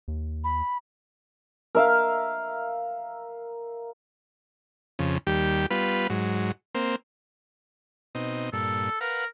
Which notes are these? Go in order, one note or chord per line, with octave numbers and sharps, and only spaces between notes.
D#2
B5
A#4 E5 F5
F2 C#3
D#2 G3 G4
G3 B3 F4 B4
G#2 F#3
A#3 C4
B2 C4 D#4
G2 A#2 A4
A#4 B4 F5 F#5